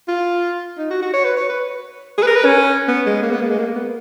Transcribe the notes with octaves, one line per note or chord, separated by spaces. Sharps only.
F4
D#4
F#4
F#4
C#5
B4
C#5
B4
G#4
B4
A#4
B4
C#4
B3
G#3
A#3
B3
A#3
G#3
A#3
B3